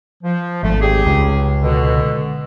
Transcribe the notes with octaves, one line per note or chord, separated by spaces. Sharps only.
F3
G#1 A3
G4 G#4
C#2
B2 D3